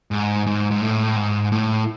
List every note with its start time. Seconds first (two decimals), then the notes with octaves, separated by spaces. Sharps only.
0.11 G#2
0.47 G#2
0.71 G#2
0.81 A2
1.16 G#2
1.52 A2